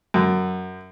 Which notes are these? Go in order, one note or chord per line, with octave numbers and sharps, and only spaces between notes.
F#2